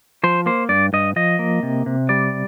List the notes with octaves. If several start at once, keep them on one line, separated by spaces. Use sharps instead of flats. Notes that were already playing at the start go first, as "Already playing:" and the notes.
F3 C5
A#3 C5
G2 D5
G2 D#5
F3 D#5
A#3
C3
C3
G3 D5